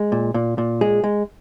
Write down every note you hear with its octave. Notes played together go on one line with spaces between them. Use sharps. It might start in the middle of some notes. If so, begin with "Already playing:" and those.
Already playing: G#3
A#2
A#2
A#2
G#3 G#4
G#3